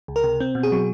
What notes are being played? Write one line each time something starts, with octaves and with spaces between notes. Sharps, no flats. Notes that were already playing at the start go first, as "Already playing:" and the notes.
C#2
A#4
C3
C4
B2
G#4
F#3